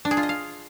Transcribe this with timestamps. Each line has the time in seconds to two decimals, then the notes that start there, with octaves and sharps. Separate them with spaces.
0.05 D4
0.11 G#4
0.17 F4
0.23 D#5
0.29 F5